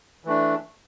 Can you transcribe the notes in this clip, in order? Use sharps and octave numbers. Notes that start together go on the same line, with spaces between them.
E3 A3 D4